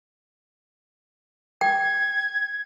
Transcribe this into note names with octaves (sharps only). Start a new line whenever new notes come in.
G5 G#6